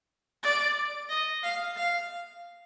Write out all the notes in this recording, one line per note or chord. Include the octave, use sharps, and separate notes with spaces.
D5
D#5
F5
F5